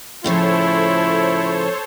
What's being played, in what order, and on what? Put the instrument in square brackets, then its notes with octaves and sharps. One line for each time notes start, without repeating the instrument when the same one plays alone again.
[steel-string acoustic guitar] A2 C#3 F3 [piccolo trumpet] E4 [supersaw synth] A4 C5 C#5